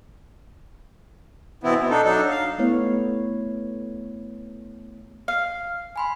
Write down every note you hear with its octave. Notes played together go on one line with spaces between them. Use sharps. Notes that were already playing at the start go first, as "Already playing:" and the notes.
B2 E3 B3 C4 E4
B2
D4 D#4 A4
F#3 D4 D#4 A4
F5
A3 B3 E4 C#5
F5
G#5 B5 C6